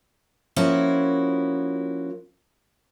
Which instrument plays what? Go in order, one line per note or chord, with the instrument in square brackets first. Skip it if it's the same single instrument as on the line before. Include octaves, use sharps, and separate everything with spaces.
[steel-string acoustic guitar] F3 A#3 C#4 E4 F#4